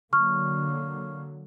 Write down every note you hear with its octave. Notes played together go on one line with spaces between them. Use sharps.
D3 F#3 A#3 C#6 F6